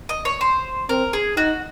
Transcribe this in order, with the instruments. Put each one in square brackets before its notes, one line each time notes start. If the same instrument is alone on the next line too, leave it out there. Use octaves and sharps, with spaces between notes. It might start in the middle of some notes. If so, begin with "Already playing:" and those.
[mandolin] D#5
C#5
C5
[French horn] C4 [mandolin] A#4
[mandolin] G#4
[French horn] D#4 [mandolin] F#4